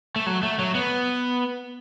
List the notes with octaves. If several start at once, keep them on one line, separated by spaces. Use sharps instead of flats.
A3
F#3
A3
F#3
B3